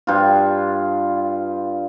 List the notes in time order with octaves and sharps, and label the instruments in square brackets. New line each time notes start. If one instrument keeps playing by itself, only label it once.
[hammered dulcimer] G2 F4